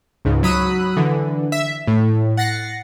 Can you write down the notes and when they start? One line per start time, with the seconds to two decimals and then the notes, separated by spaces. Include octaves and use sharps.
0.25 C#2 G#2 C#3
0.43 F#3 B5 D#6 E6 F#6
0.96 D3 E3
1.52 E5
1.87 A2
2.37 F#5 A6 A#6 C7 C#7